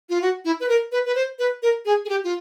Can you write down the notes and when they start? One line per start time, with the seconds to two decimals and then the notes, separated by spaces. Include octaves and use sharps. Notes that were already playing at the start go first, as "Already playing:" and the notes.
0.09 F4
0.22 F#4
0.45 E4
0.60 B4
0.69 A#4
0.92 B4
1.05 B4
1.15 C5
1.39 B4
1.63 A#4
1.86 G#4
2.05 G#4
2.09 G4
2.24 F4